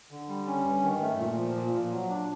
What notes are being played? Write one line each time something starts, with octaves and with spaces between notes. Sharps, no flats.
D3
G3
C#4
G2
D#3
A3
A#2
F3
A#2
A#2
F#3
D4